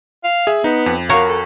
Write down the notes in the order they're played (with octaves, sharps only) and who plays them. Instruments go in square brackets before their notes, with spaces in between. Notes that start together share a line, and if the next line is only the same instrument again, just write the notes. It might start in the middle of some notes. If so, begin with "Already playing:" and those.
[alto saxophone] F5
[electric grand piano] G#4 E5
[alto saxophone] B3 [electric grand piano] D#4
[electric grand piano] F2
[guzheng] F#4 A#4 C#5 [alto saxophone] F5
[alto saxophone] A4